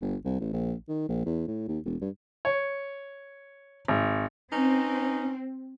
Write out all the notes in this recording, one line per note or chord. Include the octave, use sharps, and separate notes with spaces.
G1
C2
A1
A#1
D#3
A#1
E2
A2
D#2
E1
G2
C#5
G#1
C4 C#4 D#4 B4